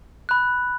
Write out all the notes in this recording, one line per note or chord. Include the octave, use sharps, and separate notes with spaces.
B5 F#6